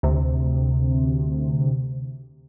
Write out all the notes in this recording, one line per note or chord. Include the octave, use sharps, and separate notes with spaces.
D2 C3